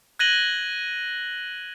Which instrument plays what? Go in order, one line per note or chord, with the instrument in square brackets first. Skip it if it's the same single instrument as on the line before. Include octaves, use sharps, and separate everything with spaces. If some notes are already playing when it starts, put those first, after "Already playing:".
[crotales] F#6 G#6 A#6 D#7 F#7 G7